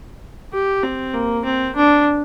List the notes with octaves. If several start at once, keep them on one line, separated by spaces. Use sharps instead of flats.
G4
C4
A#3
C4
D4